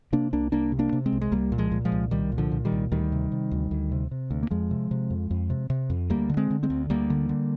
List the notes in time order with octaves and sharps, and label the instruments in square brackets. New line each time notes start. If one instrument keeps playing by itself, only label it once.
[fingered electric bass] C3 A#3 D4
C2 A#3 D4
C2 A#3 D4
C3
A#3 D4
C3
G#3 C4
C2
G#3
C2 G3 A#3
A#2
F3 G#3
A#2
F3 G#3
C2
C2 D#3 G3
A#2
D3 F3
A#2
D#3 G3
C2
D2 D#3 G3
C3
C3
D2
D2
C3
C3
D2
A#3
F2 F3 G#3
C3
C3
F2
F2
C3
C3
F2
D2 G3 A#3
D3
G#3 C4
D3
G#3 C4
D2
D2 G3 A#3
D3
D3